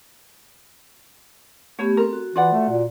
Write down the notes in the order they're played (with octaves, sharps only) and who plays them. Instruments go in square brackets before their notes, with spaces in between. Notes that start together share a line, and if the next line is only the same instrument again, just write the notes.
[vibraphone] A3 B3 G4 [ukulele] C#5
[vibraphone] C4 A4 [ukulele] A#4
[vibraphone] F#4
[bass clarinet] E3 [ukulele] F4 D5 F#5
[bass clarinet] A3
A#2